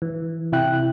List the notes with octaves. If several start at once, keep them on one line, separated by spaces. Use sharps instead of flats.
E3
C3 E4 G5 F#6